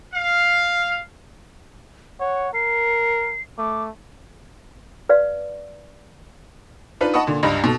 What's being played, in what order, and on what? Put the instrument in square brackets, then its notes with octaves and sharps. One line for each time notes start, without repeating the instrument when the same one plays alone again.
[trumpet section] F5
[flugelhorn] C#5 [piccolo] F#5
[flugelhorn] A#4 [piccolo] C7
[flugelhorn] A3 [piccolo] D6
[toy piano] B4 D5 F5
[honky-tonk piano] D4 D#4 F4 B4
D#5 F#5 A5 B5 C#6 D#6
A#2 D3
C#2 G2 G3 D#5 A#5 B5
B2 A4